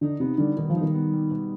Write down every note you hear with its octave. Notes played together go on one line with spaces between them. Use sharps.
D3 D#4
C3 B3
D3 G3
B2 D#3
F3
D#4
D#3
B3
G3
B2